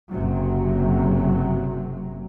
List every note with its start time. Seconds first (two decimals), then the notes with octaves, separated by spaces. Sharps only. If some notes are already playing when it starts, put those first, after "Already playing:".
0.12 F#1 F#2 C3 F#3